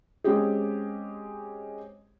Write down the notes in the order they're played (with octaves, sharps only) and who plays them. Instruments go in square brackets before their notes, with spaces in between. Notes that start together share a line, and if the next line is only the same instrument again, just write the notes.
[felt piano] G#3 C4 C#4 G4 G#4